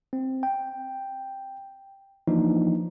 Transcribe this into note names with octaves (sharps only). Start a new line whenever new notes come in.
C4
G5
E3 F3 A#3 D4 D#4